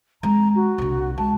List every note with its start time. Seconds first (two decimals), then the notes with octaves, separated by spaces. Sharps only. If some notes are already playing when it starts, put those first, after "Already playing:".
0.23 G#3 C4 A#5
0.56 F#4
0.78 C2 D3
1.18 G#3 A5